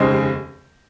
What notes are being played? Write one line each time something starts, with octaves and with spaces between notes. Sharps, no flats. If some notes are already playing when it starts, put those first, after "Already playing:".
Already playing: F1 D#2 C#3 G#3 C5 D#5